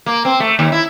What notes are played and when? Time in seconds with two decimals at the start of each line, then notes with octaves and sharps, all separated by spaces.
0.06 A#3
0.25 C4
0.40 A3
0.59 D#2
0.72 E4